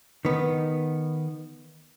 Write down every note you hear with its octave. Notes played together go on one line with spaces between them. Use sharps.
D#3 B3